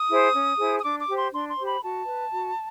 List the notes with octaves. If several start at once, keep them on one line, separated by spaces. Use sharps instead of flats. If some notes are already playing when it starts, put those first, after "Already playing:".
Already playing: D#6
E4 G#4 C5
C#4
E4 G#4 C5
D#6
D4 D6
D6
G4 C5
C6
D4 C6
C6
G4 C5
B5
F#4 A5
B4
F#4